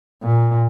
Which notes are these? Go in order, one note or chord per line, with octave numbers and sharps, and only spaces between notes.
A#2